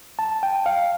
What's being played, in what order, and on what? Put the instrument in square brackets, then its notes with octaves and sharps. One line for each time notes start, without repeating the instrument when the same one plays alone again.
[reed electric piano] A5
G5
F5